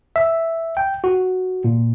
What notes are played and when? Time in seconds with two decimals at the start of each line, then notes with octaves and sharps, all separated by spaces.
0.16 E5
0.77 G5
1.04 F#4
1.64 A#2